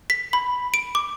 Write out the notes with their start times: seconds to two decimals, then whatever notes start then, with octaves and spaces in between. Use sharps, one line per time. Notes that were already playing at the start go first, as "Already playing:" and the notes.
0.10 B6
0.33 B5
0.74 D7
0.95 D6